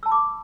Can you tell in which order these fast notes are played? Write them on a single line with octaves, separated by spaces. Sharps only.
E6 A5 B5 D6